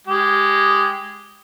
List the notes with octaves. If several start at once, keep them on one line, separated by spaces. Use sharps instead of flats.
G#3 G4